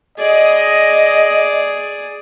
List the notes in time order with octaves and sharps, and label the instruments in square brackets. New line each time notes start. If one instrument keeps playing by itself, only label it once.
[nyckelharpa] G#4 D5 [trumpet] D#5